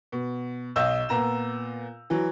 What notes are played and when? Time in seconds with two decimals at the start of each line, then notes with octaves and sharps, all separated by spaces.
0.12 B2
0.76 B1 D#5 E6 G6 E7
1.09 A#2 B3 A#5 E7
2.10 E3 F#3